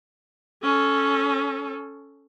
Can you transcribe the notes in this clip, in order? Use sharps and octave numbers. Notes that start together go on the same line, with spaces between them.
C#4 A4